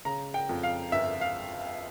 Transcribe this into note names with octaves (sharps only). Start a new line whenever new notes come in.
C#3 A#5
G5
F2
F5
G1 E5
F5